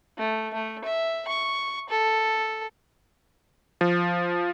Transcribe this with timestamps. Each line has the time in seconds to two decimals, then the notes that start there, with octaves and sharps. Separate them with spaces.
0.18 A3
0.53 A3
0.85 E5
1.28 C#6
1.90 A4
3.81 F3